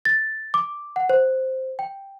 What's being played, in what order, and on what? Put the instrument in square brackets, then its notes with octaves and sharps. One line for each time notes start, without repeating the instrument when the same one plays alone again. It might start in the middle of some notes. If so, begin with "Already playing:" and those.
[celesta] A6
D6
F#5
C5
G5